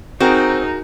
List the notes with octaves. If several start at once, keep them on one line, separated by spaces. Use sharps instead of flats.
C4 D#4 F#4 G#4 A#4